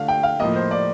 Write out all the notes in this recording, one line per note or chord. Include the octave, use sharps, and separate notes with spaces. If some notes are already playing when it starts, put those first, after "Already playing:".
Already playing: D3 A3 F5
G5
F5
A2 F3 A#3 D#5
C5
D5